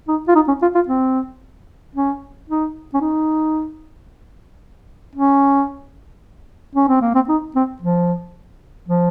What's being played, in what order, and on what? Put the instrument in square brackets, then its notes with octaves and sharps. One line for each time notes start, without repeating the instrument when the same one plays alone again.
[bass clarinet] D#4
F4
D#4
C#4
F4
F4
C4
C#4
D#4
C#4
D#4
C#4
C#4
C4
A#3
C4
D#4
C4
F3
F3